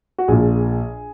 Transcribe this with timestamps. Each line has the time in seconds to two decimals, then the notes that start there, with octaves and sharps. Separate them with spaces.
0.18 F#4
0.28 A#1 A#2 G#4